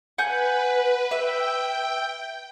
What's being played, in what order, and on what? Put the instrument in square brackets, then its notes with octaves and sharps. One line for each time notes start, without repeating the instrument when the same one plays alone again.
[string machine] B4 [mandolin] F#5 G#5 G6
[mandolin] E5 [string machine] G5